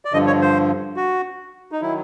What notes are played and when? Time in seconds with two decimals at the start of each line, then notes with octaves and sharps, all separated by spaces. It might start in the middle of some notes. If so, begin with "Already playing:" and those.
0.05 D5
0.13 G2 D3 F3 D#5
0.27 C#5
0.41 C5
0.96 F#4
1.72 D#4
1.81 D#3 F#3 E4